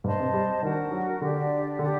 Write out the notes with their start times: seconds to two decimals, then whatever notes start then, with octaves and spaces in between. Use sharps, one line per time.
0.04 G2 C5 D#5 A5 C6
0.20 C3
0.34 G3
0.63 D#3 D4 F#4 A#4 F#5
0.91 F#3
1.21 D3 D4 G4 D5
1.79 D3 G4 D5 F#5